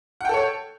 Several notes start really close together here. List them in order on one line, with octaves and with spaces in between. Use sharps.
F#5 G5 A4 C#5